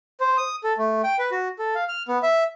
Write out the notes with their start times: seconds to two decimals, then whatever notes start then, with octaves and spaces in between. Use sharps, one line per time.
0.20 C5
0.37 D#6
0.64 A4
0.78 A3
1.04 G5
1.19 B4
1.32 F#4
1.59 A4
1.75 F5
1.89 F6
2.08 B3
2.23 E5